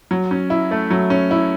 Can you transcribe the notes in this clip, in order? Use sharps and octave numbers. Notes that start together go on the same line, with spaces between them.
F#3
C#4
E4
A3
F#3
C#4
E4